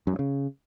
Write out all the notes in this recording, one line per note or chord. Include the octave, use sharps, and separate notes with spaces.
F#2
G2
C#3